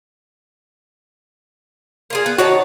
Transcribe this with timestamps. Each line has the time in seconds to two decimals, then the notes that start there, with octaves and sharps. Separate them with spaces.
2.10 A#3 F4 G#4
2.26 B3
2.38 D#3 F#4 C#5 A5